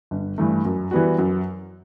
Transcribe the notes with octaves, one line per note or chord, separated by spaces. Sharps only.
G1
G2 E3 A3
F#2
E3 G3 B3 F#4
F#2